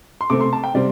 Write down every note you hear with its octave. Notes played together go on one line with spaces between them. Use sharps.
C6
C3 A3 C4 D6
C6
A5
G5
C3 G3 C4 D5